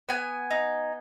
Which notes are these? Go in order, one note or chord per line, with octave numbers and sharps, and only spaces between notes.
B3 G#5
D#4